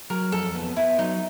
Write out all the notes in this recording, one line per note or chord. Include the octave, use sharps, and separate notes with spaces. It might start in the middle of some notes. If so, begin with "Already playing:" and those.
F#3 A#4
F2 A4
B3
B3 E4
F#3 D#4